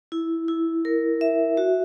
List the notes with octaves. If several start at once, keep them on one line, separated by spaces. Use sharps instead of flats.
E4
E4
A#4
E5
F#4